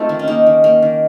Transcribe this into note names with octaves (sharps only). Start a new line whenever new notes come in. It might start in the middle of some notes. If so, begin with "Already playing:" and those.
Already playing: A3 C4 D#4 F4
D#3
C#4
A#3 D#4
D#3
A#3
D#3